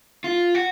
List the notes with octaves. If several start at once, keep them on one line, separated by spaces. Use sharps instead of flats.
F4
F#4